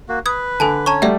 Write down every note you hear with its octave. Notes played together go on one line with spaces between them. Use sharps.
A#3 F#4
B4 D#6 G#6
D3 A4 G#5 A5
C#4 C#5 A5 A#5 C#6
G3 A3 D5 E5 F#5